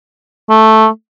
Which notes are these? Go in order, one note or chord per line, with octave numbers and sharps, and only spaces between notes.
A3